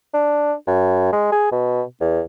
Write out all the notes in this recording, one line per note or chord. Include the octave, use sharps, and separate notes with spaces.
D4
F#2
G#3
G#4
B2
E2